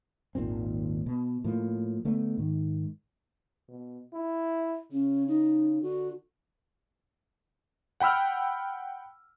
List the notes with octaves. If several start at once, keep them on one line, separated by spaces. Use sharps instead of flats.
G#1 D#2 A#2 C4
B2
A2 F3 A#3
D3 A3 B3
G#2 D#3
B2
E4
C#3 C#4
D#4
D3 F#4
F#5 G5 B5 E6 F6